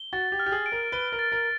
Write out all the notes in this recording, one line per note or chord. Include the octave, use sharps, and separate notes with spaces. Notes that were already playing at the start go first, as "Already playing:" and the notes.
Already playing: G7
F#4 A6
G4
F6
G4
G#4
D7
A#4
B4 G7
A#4
A6
A#4